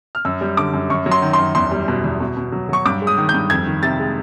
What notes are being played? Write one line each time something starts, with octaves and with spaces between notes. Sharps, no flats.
F6
F#2 E6
G3
D3 D6
F#2
F#2 C#6
F#3
C6
D#3
C6
F#2
E2 C6
G3
B2
E2
B2
B2
F#3
F#3 C#6
G2 D6
G#3
D#6
D#3
G6
G2
F2 G#6
D#3
C3 A6
G#3